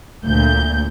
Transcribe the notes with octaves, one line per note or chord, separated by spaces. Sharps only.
D2 A#2 D3 G6